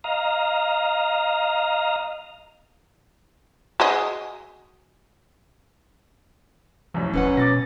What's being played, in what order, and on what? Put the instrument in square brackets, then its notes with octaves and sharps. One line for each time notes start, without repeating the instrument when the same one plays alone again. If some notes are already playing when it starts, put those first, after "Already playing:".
[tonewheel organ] D#5 F5 A#5
[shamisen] F#4 G#4 D#5
[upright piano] C2 F#2 A2 [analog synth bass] F3
[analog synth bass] E1 [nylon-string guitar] C#4 B4 F#5
[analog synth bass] B2 [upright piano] D6 A6 A#6